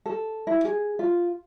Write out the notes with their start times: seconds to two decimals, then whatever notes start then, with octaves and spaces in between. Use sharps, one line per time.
0.06 A4
0.47 E4
0.64 G#4
0.99 F4